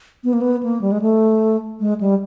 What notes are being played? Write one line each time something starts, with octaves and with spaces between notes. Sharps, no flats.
B3
A#3
B3
A#3
G3
G#3
A3
G#3
G3